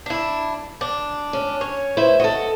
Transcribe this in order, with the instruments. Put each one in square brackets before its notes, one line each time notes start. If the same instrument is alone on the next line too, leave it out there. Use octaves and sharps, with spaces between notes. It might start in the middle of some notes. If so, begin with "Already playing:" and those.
[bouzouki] D4 E4
D4
[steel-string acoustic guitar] C#4
[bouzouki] C#5
[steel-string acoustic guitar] E4 B4 C5
[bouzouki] F#4 [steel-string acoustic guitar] A4 D#5